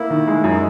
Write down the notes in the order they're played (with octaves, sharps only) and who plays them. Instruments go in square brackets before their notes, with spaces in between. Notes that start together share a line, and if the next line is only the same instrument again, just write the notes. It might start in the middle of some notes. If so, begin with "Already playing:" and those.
Already playing: [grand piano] A#3 [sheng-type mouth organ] E4
[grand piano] D#3
G#3
F#2
[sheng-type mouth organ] D#4